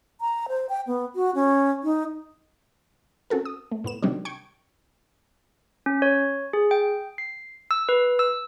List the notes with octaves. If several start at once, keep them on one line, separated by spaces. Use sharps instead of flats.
A#5
C5
G5
B3
F#4
C#4
D#4
C4 C#4 F#4 A4 A#4
D#6
A3
A2 B3 E7
C3 D#3 F#3 G3 C4 D4
G5 C#6 G#6
C#4
C#5
G#4
G5
C7
E6
B4
E6